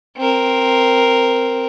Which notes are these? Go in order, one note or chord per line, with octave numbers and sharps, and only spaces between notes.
C4 A#4